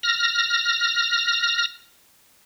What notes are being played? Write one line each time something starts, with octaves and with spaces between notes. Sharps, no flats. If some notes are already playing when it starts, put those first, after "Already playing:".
F6 A#6